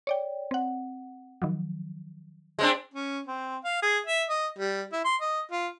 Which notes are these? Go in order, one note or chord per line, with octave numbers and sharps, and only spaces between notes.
C#5 D5 G5
C4 F#5
D#3 F3 F#3
G#3 C4 D4
C#4
C4
F5
G#4
E5
D#5
G3
E4
C6
D#5
F4